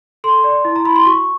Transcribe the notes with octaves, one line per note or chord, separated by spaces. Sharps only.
A4 C6
D5
E4
A#5
E4 B5
C6
F#4 C#6